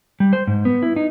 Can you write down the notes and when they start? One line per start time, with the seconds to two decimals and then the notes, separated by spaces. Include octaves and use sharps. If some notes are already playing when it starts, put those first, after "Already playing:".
0.20 G3
0.33 C5
0.47 G#2
0.65 B3
0.83 E4
0.96 D#4